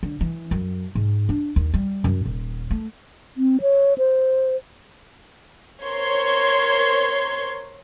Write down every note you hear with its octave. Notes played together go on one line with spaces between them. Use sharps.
D3
E3
F#2
G#2
D4
D#2
G3
F#2
D#1
A3
C4
C#5
C5
A#4 C5 C#5 C6 G#6